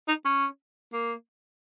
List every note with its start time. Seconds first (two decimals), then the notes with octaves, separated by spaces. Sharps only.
0.08 D#4
0.25 C#4
0.93 A#3